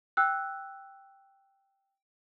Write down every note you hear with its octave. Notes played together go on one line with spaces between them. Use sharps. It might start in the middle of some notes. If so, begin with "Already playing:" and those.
G5 E6 F#6